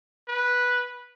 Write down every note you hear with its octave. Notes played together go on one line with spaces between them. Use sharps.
B4